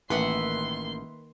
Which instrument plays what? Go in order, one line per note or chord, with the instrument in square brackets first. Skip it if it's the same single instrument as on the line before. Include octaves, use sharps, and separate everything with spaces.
[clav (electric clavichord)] A1 [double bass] D#3 A#3 [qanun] B4 E5 F#5 [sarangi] C6